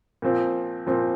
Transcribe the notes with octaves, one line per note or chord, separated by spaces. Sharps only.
A#2 F3 C4
A#2 F3 C4